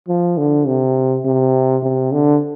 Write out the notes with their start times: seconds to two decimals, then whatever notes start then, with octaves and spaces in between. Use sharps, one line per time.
0.08 F3
0.37 D3
0.66 C3
1.25 C3
1.83 C3
2.12 D3